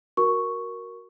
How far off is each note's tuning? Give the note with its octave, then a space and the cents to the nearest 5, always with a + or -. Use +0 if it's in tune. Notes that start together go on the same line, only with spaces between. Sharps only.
F#4 +0 A#4 +5 C#6 +0